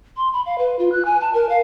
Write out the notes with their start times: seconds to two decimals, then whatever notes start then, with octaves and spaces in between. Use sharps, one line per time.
0.17 C6
0.33 B5
0.46 F5
0.58 B4
0.79 F4
0.92 F#6
1.05 G#5
1.21 A5
1.34 A#4
1.50 F5